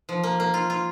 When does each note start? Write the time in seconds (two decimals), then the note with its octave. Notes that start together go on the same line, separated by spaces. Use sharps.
0.09 F3
0.23 A#3
0.40 A#3
0.54 F4
0.70 F4